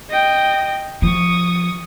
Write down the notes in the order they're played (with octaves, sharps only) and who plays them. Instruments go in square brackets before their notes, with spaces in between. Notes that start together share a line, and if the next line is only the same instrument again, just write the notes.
[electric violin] D#5 G5
[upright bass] F3 [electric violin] C#6 D#6